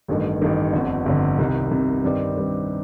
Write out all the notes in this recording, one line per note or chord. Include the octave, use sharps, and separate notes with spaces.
A1 G2 D#3 A3
A1 G2 D#3 A3
G1 F2 D3
G1 F2 D3
C2 C3 D#3
C2 C3 D#3
G2 D#3 G3 C4
G2 D#3 G3 C4